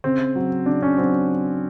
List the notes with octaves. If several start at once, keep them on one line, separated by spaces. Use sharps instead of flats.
C#3 C4
F#3
C#3 D4
C#4
F#3 C4